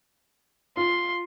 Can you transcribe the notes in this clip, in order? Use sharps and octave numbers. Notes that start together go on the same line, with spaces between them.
F4 C6